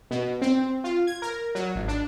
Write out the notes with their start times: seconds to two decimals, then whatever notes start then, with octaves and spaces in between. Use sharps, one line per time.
0.11 B2
0.42 C4
0.84 F4
1.07 G#6
1.22 A#4
1.55 F#3
1.76 G#1
1.88 D4